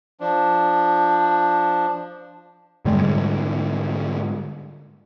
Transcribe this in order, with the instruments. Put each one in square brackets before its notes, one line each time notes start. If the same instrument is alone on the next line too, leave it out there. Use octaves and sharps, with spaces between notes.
[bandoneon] F3 D4
[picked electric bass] G#2 D3 G3 G#3